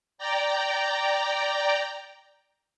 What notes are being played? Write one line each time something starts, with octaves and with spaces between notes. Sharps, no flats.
D5 G5 A#5